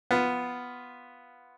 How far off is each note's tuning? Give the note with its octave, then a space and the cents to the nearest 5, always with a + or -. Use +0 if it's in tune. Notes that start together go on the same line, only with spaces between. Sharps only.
B3 +0 F4 +0